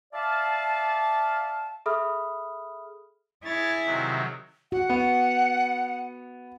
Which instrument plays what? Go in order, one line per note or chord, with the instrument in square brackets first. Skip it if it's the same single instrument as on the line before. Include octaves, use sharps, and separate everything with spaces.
[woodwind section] D5 E5 F5 A5
[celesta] G#4 A4 E5 B5 D#6 F6
[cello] E4 G#4 [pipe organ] C#5 A6
[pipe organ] C3 D#3 F#3
[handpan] F#4 [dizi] F#5
[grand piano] B3